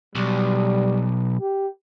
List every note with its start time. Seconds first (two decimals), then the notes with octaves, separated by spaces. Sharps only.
0.15 B1 G3
1.41 G4